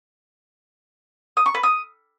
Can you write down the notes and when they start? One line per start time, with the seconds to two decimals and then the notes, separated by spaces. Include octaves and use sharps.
1.37 D#6
1.46 C#6
1.55 B4
1.63 D#6